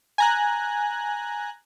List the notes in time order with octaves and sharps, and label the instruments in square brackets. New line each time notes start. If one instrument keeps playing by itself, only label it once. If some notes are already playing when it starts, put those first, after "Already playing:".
[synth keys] G#5 A#5 F#6